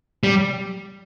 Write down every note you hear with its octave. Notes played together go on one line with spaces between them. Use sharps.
G3